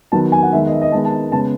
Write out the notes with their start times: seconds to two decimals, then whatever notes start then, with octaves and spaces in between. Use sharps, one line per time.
0.12 D#3 F#3 B3 A5
0.32 G#5
0.43 F#5
0.52 D#3 G#3 B3 E5
0.67 D#5
0.72 E5
0.82 D#5
0.92 D#3 G#3 B3 A5
1.05 A5
1.32 C#3 G#3 B3 A5